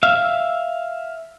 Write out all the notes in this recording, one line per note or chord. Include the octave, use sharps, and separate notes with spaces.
E5 F5